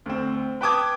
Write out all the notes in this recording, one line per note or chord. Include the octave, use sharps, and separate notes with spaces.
D2 C4
B4 G5 A5 D6 D#6 G#6